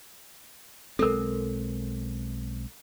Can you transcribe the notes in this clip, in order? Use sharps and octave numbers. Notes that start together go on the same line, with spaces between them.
B1 G#3 C4 A4 A#4